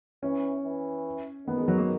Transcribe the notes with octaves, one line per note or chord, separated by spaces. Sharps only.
E3 C#4
E3
D#3 B3
G#3
F#3
A#3